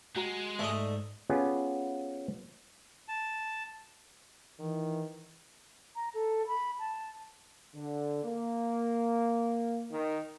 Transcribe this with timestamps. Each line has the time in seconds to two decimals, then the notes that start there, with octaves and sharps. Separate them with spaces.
0.16 G#3 F#4 A#5
0.59 G#2 A3 D5 D#5 A5
1.30 B3 C#4 F4 G4 G#4 B4
3.08 A5
4.59 D#3 E3
5.96 A#5
6.14 A4
6.47 B5
6.79 A5
7.74 D3
8.24 A#3
9.91 D#3